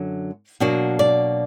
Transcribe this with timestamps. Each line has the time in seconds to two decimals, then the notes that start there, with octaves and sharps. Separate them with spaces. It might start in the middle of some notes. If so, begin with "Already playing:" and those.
Already playing: F#2 D3 F#3
0.60 B2 F#3 A#3 D4 F#4
0.99 D5